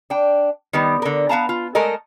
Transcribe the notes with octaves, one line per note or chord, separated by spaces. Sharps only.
D4 G5
D#3 G3 B3
D3 A#4
B3 F5 A5 A#5
F4
G#3 A3 A4 A#4 D#5